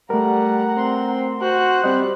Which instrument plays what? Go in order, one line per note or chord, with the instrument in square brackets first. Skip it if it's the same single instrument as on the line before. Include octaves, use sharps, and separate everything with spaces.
[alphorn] G3 [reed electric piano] A3 A#4 [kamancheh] F#5 A#5
[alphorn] C4 [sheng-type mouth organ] C6
[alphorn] F#4 [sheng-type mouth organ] C5 [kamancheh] F#6
[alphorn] G3 [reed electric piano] C4 D#5